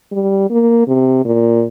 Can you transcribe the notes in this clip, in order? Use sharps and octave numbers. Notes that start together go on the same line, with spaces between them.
G3
A#3
C3
A#2